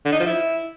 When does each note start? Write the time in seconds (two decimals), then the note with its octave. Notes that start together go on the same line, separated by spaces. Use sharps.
0.05 D3
0.12 D#4
0.20 F3
0.27 E4